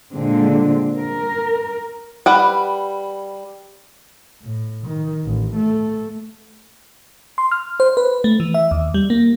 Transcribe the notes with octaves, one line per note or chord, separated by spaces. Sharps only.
A#2 D3 G#3 C4
A#4
G3 B4 F#5
A2
D#3
A1
A3
C6
F6
C5
B4
A3
E3
E5
D#2
G3
A#3